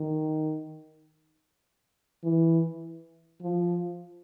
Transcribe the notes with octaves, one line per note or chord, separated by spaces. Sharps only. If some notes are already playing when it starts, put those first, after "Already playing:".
Already playing: D#3
E3
F3